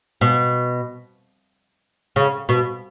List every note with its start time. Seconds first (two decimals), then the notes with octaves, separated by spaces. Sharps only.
0.21 B2
2.16 C#3
2.49 B2